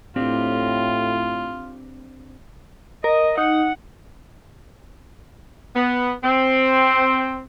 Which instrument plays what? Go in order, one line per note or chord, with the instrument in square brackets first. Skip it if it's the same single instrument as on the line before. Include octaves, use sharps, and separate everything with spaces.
[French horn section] A2 [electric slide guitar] C4 D4 G4 [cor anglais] F4
[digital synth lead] A#4 [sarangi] D#5
[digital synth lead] D#4 [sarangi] F#5
[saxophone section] B3
C4